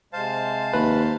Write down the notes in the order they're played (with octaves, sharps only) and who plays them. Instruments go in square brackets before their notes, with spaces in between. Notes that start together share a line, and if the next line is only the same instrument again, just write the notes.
[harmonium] C3 G#3 [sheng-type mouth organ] C5 F5 A5
[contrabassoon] D#2 [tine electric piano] B4